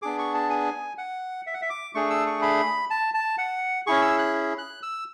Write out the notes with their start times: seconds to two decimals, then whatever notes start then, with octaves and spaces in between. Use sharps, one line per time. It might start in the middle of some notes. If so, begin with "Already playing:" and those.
0.02 B3 D4 G#4 D6
0.19 C#6
0.34 A5
0.50 G#5
0.98 F#5
1.47 E5
1.54 F#5
1.61 E5
1.70 D6
1.95 A3 D4 G#4 C#6
2.10 E6
2.26 C#6
2.42 B5
2.90 A5
3.14 A5
3.38 F#5
3.87 C#4 E4 G#4 C#6
4.02 E6
4.19 F#6
4.58 F#6
4.83 E6